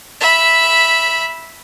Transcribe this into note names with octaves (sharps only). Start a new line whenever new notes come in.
E5 B5